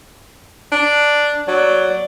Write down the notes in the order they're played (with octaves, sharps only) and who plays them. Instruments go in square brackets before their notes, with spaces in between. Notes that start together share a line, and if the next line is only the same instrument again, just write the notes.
[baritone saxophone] D4
[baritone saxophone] F#3 [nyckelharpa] D5